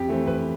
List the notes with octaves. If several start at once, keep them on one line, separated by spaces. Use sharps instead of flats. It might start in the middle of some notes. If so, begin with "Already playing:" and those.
Already playing: F2 G4
E3 A3 C4
F2 B4